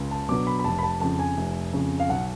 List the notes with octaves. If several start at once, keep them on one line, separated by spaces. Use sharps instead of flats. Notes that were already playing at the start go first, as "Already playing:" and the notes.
Already playing: C#2
A5
B2 F#3 B3 D4 D6
B5
B5
F1 A5
B5
A5
F2 C#3 A5
G#5
F1
F2 C#3
F5
B1 F#5